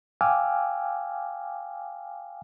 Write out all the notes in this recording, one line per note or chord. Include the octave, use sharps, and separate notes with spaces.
F5 G5 G#5 D6 E6 F6